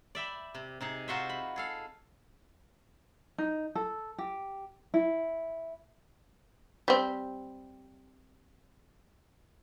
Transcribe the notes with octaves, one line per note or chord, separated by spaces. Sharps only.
D5 E5 G5 B5
C3
C3 D#4 G#4
D#4 F4 F#4 C5 E5
B5
G#4 A4 F5
D#4
A4
G4
E4
G3 C4